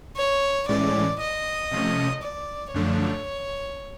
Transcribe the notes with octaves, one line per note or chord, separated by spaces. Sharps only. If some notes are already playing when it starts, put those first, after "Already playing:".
C#5
A2 E3 G#3 C#4 D5
D#5
C3 F3 A3 C#4
D5
F#2 D3 F3 A3 D4 C#5